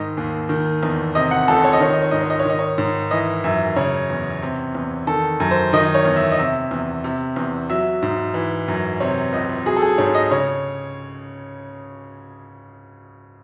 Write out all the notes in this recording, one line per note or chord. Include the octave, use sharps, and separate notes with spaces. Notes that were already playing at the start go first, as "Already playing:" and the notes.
Already playing: G#2 D#3 D#5
D#2
D#3
E2
C3 D#5
F#5
C#2 A4
C#5
D#5
D#3 C#5
D#5
C#5
G#2 D#5
C#5
D#5
C#5
D#3 D#5
C#5
G#2
E3 D#5
F#2 E5
C#3 C#5
E2
C3
E2
D#3 A4
F#2
C5
D#3 D#5
C#5
E2
E5
D#5
C3 E5
E2
C3
E2
F#3 E5
G#2
E3
F#2
C3 C#5
C#2 D#5
F#3 G#4
A4
G#4
G#2 C#5
D#5
C#3 C#5